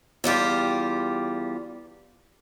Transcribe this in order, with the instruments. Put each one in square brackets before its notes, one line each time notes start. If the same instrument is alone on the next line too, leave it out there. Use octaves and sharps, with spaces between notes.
[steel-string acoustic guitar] E2 G3 F4 G4